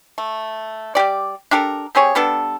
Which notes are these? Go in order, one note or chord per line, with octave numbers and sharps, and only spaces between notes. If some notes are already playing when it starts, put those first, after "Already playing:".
A3
G3 A#3 G4 D5
D4 G4 A4 A#4
C4 G4 G#4 C#5
G3 B3 D4 A4